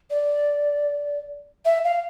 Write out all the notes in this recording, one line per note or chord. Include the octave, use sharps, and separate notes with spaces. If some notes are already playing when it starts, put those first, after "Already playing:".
D5
E5
F5